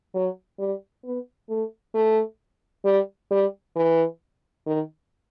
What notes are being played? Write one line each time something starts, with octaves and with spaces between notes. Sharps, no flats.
F#3
G3
B3
A3
A3
G3
G3
E3
D#3